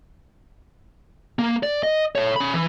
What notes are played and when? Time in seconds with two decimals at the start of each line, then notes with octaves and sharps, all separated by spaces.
1.39 A#3
1.63 D5
1.83 D#5
2.15 A4 C#5
2.36 C#4 B5
2.54 E3